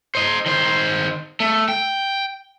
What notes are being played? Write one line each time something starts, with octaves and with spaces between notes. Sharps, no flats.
C5 D#5
D#3 C5
A3
G5